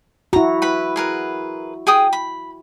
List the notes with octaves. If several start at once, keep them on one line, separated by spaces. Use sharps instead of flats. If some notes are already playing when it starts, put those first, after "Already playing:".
E4 F#4 A#5
B4 B5
G#4 A#4 B4
G#4 G5 D#6
B5